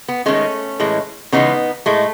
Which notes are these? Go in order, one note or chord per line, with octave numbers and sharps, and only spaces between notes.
B3
D#3 G#3 A3 C#4
A2 E3 G#3
C#3 E3 G#3 B3 D#4
A2 G#3 A3